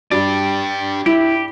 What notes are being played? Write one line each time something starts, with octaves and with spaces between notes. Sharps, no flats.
G2 D4 G4 D5
E4 G4